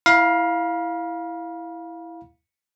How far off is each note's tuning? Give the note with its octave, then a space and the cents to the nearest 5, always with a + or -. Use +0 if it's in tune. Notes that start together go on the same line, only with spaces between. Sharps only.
E4 +0 F5 +10 B5 -40